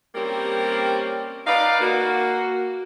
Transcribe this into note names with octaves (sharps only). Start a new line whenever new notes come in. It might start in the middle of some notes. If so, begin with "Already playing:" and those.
G3 A#3 C4 C#4 G4 A#4
D#4 B4 D5 F5
A#3 F#4